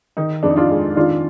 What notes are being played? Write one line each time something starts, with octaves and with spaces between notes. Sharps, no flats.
D#3 D#4
F2 D4
D#4
D4 F4
G#3
D#3 D4 F4